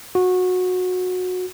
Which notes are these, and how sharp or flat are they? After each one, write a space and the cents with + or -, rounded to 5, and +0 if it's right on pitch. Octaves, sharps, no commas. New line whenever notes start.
F#4 -20